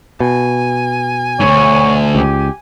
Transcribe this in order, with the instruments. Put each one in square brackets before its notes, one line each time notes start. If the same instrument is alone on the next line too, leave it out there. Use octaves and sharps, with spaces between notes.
[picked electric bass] B2 [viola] G#5
[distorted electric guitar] D2 G#2 [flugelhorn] C#5
[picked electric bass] C#2 [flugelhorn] G4